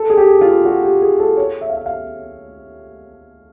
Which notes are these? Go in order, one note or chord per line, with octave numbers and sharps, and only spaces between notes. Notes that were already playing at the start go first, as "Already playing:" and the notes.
Already playing: A4
G#4
G4
F4
F#4
G4
G#4
A4
C#5
E5
F5
E5
F5